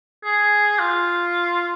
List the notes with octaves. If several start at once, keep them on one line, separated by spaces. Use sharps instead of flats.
G#4
F4